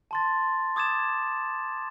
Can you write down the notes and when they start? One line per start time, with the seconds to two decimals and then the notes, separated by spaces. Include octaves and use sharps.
0.11 A5 C6 A6
0.76 D6 D#6 G#6 A6 E7